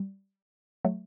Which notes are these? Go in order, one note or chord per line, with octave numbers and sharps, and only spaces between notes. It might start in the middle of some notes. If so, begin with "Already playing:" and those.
Already playing: G3
F#3 A3